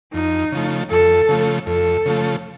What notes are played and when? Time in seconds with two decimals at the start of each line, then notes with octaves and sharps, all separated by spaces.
0.14 F2 D#4
0.52 C#3 F3 A3
0.91 F2 A4
1.29 C#3 F3 A3
1.67 F2 A4
2.06 C#3 F3 A3